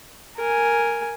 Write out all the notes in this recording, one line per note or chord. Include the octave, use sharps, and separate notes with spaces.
A#4 G#5